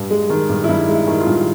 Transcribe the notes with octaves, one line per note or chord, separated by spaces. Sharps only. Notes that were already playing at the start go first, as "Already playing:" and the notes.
Already playing: G2
G#3
D#3
G2
E4
G2 D#4
G#3
E4
D#3
F4
G2